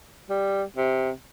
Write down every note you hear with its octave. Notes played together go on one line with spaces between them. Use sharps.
G3
C3